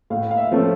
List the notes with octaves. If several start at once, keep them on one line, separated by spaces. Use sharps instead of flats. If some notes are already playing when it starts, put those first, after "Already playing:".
A2 F5
F5
E5
F3 A3 C#4 A4